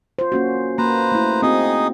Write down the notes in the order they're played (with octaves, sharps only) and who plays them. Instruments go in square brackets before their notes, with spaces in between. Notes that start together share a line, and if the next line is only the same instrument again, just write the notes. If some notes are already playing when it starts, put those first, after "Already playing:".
[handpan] F4 C5
A#3 C#4 F#4
[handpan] A#3 [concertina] B4 C5 A#5
[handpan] A3 E4
[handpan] C4 F#4 [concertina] D#4 G#4 D#5